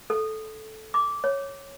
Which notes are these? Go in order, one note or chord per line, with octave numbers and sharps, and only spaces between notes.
A4
D6
C#5